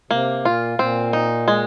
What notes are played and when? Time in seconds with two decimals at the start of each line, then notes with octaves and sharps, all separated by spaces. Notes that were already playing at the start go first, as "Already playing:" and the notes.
0.11 C3 A#3
0.45 A#2 F4
0.79 A#2 C4
1.13 D#4
1.48 G#3